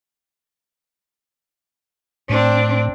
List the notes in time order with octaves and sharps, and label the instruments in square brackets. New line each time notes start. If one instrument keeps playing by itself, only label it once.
[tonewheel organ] A2 [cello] C4 D4